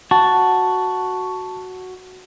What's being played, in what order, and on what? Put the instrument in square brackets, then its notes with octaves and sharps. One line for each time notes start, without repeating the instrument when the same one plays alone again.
[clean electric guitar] F#4 [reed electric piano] A5